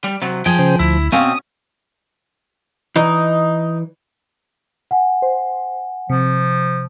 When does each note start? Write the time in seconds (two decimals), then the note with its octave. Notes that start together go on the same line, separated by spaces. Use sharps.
0.04 G3
0.22 C3 F#3
0.46 F3 G#4 G5
0.59 C#3 C5
0.79 D2 E4
1.12 B2 C4 C#4 F5 G#5 D#6
2.96 E3 D#4
4.91 F#5 G#5
5.22 C5
6.10 C3 F3